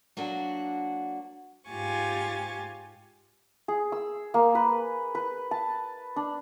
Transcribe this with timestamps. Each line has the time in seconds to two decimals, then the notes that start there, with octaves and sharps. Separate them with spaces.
0.17 F#3 A#3 D4 F#4
1.68 G#2 F4 G4 G#5 C#6 A6
3.68 G#4
3.92 E6
4.34 A#3
4.55 B4
5.15 B4
5.51 A5
6.16 D4